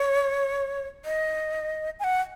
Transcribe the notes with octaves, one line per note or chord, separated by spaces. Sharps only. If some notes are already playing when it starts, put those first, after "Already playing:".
Already playing: C#5
D#5
G#5
F#5